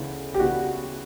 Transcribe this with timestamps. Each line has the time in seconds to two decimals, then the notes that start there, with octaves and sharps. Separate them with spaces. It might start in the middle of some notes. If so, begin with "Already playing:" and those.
Already playing: D2 C#3 E3 B3 D4
0.34 G4
0.39 C#3 E3 B3 D4 F#4